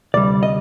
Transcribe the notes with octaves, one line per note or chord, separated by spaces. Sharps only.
D2 C3 G3 D5
D#5